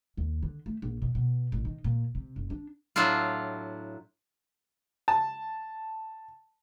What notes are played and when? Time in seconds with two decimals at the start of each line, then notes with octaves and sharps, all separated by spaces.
0.17 D#2
0.43 D3
0.66 A3
0.82 A#1
1.02 B2
1.15 B2
1.52 A1
1.65 D#3
1.84 A#2
2.15 C3
2.36 F#1
2.50 D4
2.96 A2 F#3 D4 E4 F4
5.08 A5